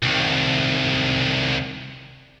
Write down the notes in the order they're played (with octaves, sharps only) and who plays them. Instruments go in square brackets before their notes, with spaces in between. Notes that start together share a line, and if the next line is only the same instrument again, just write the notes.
[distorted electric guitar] C2 D#3